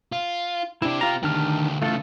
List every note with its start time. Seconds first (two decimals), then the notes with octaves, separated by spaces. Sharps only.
0.12 F4
0.82 C4 D4 E4 G4
1.01 F4 A#5
1.23 D2 D#3 D4 G4 F6
1.82 C#3 E3 A3 F4 A4